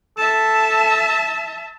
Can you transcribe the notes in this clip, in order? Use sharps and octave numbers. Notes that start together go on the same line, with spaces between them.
A4 E5 A5